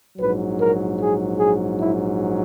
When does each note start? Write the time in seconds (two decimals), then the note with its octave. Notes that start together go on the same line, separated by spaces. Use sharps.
0.18 A#1 G#2 F#3 B4
0.59 A#4
0.99 G#4
1.38 G#4
1.79 E4